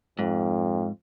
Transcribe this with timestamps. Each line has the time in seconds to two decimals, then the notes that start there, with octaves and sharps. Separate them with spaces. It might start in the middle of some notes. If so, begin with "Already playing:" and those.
0.19 F2 G#2